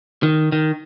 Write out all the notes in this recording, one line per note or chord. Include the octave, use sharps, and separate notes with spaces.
D#3
D#3